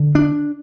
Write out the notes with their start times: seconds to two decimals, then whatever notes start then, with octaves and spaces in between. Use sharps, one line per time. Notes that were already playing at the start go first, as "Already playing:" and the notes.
Already playing: D3
0.15 D4